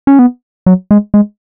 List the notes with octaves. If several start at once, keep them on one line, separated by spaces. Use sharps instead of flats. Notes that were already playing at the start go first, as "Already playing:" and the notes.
C#4
B3
F#3
G#3
G#3